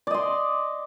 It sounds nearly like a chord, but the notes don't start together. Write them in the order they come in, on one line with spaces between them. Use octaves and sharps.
D5 D#5 C6